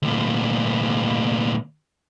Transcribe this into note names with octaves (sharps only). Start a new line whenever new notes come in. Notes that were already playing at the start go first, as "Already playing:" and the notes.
D2 A#2